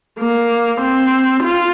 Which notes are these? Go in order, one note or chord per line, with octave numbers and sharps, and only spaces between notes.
A#3
C4
F4